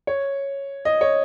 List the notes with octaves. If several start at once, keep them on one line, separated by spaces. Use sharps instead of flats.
C#5
D#5
C#5